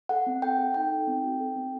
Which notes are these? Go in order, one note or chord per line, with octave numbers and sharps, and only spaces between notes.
A4 F#5
C4
A4 G5
A4
D#4 G5
D#4
C4
F#4
A4
C4